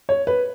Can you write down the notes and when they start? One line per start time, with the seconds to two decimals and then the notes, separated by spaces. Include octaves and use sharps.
0.09 C#5
0.27 B4